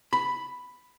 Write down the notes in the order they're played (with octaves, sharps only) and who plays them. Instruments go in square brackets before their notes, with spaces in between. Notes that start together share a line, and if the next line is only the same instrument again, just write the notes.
[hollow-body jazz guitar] B5